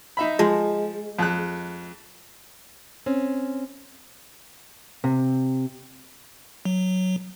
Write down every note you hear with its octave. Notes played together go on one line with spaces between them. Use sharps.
D#4 E5 B5
F3 G#3
F2 F#6
C4 C#4
C3
F#3